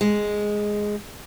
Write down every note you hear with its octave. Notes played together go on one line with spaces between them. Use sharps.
G#3